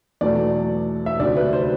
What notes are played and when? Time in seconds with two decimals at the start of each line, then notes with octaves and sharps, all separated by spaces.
0.21 E2 B2 F#3 A3 D5
1.06 E5
1.20 D2 C3 F#3 D5
1.37 B4
1.53 C5